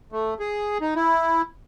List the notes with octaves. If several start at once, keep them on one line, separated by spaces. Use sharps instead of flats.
A3
G#4
D#4
E4